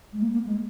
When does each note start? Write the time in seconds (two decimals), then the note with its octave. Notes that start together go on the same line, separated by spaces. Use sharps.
0.13 G#3
0.22 A#3
0.33 A#3
0.46 G#3